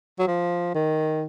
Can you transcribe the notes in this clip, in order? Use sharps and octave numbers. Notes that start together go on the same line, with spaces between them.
F#3
F3
D#3